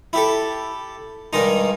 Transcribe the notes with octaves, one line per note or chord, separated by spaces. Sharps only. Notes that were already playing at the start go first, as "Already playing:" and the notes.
E4 G4 A4
G2 D#3 G#3 D#4